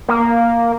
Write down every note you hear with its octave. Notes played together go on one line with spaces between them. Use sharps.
A#3